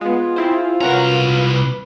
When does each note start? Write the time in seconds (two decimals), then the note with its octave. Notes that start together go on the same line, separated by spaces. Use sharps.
0.01 G#3 B3 F4 G#4
0.36 C4 E4 C5
0.81 C2 C#4 F#4 A#4 B4 A#5